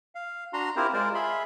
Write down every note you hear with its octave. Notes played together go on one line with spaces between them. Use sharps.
F5
D4 F#4 A#5 C6
C4 E4 F4 G4 A#4 C5
G#3 F4 A#4 C5 D5
F4 G#4 E5 B5 C6